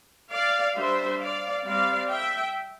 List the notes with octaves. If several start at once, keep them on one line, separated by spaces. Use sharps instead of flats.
D5 F5
G3 D4 C5 E5
D5 F5
G3 C4 D5 F5
E5 G5